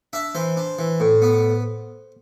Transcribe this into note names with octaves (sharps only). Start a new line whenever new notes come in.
D4 E5
E3 C5
D4
E3
A2
B3